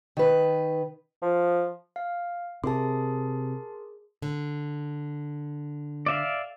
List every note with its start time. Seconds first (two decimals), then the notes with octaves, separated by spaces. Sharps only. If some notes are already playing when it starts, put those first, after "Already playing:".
0.17 D#3 B4
1.22 F3
1.96 F5
2.64 C3 G#4 A#4 A5 C6 D6
4.22 D3
6.06 D5 E5 F5